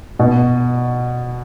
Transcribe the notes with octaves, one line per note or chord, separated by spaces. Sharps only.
B2